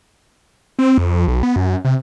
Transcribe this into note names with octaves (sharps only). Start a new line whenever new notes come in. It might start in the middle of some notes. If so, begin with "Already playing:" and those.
C4
F2
B1
B3
F#2
C3